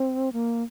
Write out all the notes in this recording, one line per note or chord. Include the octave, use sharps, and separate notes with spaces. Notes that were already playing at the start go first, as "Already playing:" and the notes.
Already playing: C4
A#3